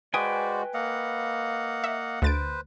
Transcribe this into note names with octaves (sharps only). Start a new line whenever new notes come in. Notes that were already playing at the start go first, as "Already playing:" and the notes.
G#3 F#4 B4 C5 D5 G5 G#5 D#6
A#3 D#5 F5 F#5
E5
D2 B4 C5 A6 D7